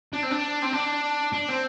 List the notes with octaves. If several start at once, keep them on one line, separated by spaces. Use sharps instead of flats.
D4
C4
D4
C4
D4
D4
C4